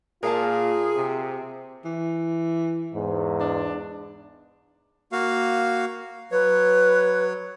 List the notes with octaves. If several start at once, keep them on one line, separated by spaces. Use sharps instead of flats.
A#2 F4 G#4 A#4 F5 A5
C3
E3
E2 G#2
D4
A#3 F#4 F5
F#3 B4 C#5